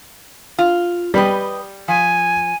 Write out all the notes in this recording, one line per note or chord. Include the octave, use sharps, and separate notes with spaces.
F4
G3 G4 B4 D#5
F3 G#5